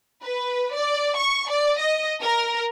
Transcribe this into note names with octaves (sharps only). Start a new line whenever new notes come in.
B4
D5
C#6
D5
D#5
A#4